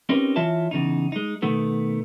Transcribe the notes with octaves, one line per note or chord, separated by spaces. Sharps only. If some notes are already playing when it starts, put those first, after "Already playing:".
C4 C#4 D#4 G4 A#4 B4
E3 F4 C#5 E5 A5
E2 C#3 D#4
G#3 D#4
B2 D#3 A3 B3